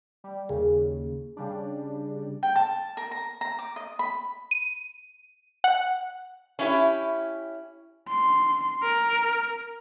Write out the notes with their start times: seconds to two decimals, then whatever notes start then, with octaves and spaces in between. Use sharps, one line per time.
0.24 G3
0.49 D#2 C#3 G#4
1.37 C#3 G3 D4
2.43 G5
2.56 A5
2.97 A#4
3.11 A#5
3.41 A#5
3.59 D6
3.76 D#5
3.99 B5
4.51 D#7
5.64 F#5
6.59 C#4 E4 G4
8.08 C6
8.83 A#4